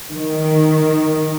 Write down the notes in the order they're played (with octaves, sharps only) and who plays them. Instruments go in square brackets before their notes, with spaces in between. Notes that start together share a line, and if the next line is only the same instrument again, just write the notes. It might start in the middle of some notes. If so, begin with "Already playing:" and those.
[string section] D#3